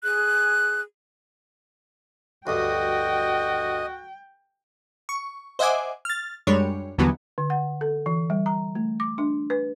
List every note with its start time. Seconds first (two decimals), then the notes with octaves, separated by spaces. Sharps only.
0.03 G#4 F#6
2.47 D2 G2 F#4 D#5 G5
5.09 C#6
5.59 C5 D#5 E5 F#5 G#5 D6
6.05 F6 A6
6.47 F#2 G3 G#3 D4 C#5
6.98 D#2 D3 E3 F#3 G3 B3
7.38 D3
7.50 F#5
7.81 A4
8.06 E3
8.30 G3
8.46 A#5
8.75 A3
9.00 D6
9.18 D4
9.50 B4